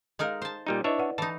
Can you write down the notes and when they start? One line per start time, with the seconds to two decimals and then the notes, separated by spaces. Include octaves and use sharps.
0.19 G#3 D#4 A#4 D#5 F5
0.42 C5 A5
0.67 A#2 G3 D#4
0.84 D4 E4 B4 C#5 D#5 E5
0.98 B4 D5 F#5
1.18 E3 D#4 A5